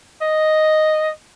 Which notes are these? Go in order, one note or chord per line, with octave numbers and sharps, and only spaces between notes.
D#5